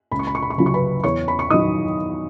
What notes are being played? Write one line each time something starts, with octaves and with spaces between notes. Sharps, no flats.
C#2 B5
C#6
B5
C#6
B5
C#6
C#3 F#3 B5
C#6
B4 B5
E2 C#5 C#6
B5
C#6
D#3 F#3 D#5 D#6